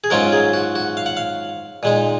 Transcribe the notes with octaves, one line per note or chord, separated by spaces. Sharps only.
G#4
G#2 F#3 C#4 F4 A#4
G#4
F#4
F#4
F5
F#5
F5
A#2 G#3 D#4